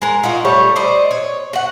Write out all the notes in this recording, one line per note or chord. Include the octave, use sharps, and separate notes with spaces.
G#3 A#4
D#4 F4 F#4
G3 A3 C#5
C5 D5 D#5
C#5
F#4 F#5